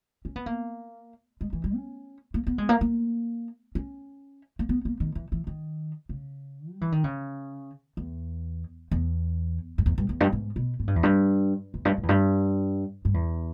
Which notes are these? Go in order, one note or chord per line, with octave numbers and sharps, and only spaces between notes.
C#4
B3
A#3
G#3
E3
G3
C#4
A#3
B3
G#3
A#3
A#3
C#4
A#3
B3
A#3
D#3
E3
E3
D#3
C#3
G3
E3
D#3
C#3
E2
E2
G2
E2
G2
E2
G2
G#2
B2
G#2
G2
E2
G2
E2
G2
G#2
E2
G2
G2
E2